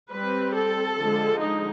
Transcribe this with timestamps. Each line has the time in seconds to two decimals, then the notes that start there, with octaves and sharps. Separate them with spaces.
0.11 G3 C4 B4
0.54 A4
0.96 D3 F3 G#3
1.40 D#4